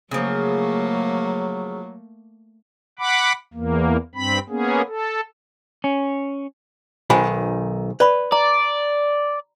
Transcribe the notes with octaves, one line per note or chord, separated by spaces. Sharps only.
C#3 F3 F#3 A3 A#3
F#5 B5 D6
E2 A#3
G2 C4 B5
A#3 B3 C#4 G#4
A4
C#4
B1 D#3 F#4 C5 G#5 B5
B4 D5 B5 C#6
D5 A#5